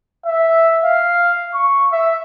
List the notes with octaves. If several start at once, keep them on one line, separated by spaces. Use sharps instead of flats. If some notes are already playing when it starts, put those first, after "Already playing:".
E5
F5
C#6
E5